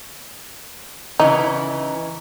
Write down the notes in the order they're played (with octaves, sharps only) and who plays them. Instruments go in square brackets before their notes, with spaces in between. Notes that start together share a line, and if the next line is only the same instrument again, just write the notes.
[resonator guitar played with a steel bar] C#3 E3 [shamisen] D#4